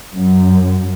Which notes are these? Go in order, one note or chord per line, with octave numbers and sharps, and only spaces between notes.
F#2